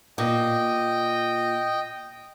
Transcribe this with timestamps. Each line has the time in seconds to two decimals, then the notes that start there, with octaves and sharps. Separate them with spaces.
0.18 A#2 D#5 G5